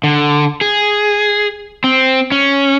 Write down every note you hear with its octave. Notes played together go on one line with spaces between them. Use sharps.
D3
G#4
C4
C#4